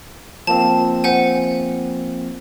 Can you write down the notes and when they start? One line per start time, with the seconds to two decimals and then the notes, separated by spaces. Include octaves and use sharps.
0.47 F3 A#3 C4 A5
1.04 C5 F#5 G#5